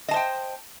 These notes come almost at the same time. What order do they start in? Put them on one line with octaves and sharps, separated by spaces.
D#5 A5 C5 G5